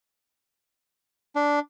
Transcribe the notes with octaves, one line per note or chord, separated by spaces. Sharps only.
D4